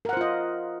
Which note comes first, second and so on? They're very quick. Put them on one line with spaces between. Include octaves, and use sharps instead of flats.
A#4 F#5 C5 F4 D#5